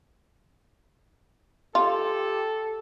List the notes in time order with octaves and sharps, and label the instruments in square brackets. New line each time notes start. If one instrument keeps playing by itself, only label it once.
[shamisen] F4 [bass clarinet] G4 [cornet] A4